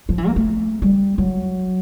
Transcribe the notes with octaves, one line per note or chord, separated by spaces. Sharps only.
F3
E3
A#3
A3
G3
F#3